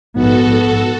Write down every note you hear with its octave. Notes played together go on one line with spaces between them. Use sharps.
A#1 G#2 B3 F#4 A4